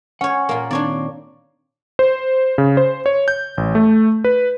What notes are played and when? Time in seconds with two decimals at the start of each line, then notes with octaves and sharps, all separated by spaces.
0.21 C#4 C#5 F#5
0.49 A#2 A#3
0.71 D#3 A#3 C4 D4 C#5 D5
1.99 C5
2.58 C#3
2.77 C5
3.06 C#5
3.28 G6
3.57 A1
3.75 A3
4.24 B4